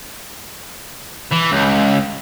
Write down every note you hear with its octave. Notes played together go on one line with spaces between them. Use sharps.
E3
C#2